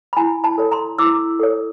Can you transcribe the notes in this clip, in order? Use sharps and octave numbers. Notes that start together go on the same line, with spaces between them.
B5
E4 G#5 A#5
A5 B5
A4 C#5
A#5 C6
E4 D6 E6
A4 C#5